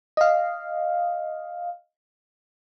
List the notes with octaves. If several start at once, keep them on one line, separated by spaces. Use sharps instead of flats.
D#5 F5